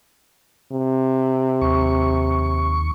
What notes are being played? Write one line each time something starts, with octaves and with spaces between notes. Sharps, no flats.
C3
D#2 C#6